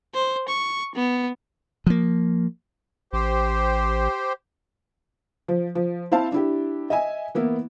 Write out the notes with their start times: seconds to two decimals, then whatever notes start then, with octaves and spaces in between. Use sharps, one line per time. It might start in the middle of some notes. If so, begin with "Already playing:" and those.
0.14 C5
0.48 C#6
0.95 B3
1.87 F3 A#3
3.13 A1 G4 C5
5.48 F3
5.75 F3
6.11 C4 E4 C5 F5 A5
6.32 D4 E4 G4
6.90 D#5 E5 G#5
7.35 E3 A#3 B3 E4